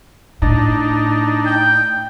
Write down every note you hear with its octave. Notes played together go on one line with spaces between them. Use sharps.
A2 D4 D#4
G5